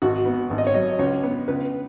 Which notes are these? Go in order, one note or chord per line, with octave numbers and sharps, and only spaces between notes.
G#1 F#4
B3
G#1
D#5
C#5
F#3 D#5
C#2 C#5
B3
C#2 B4